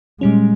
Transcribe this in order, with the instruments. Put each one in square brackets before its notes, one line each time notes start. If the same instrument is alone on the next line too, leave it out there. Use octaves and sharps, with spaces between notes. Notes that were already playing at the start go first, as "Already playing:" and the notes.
[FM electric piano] A#2 G3 C#4 [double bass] G#3